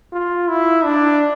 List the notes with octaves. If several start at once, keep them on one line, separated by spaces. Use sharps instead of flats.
F4
E4
D4